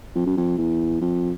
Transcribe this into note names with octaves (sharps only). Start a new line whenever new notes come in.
F2
F#2
F2
E2
F2